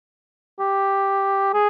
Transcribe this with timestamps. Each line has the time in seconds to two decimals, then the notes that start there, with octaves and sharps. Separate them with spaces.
0.60 G4
1.54 G#4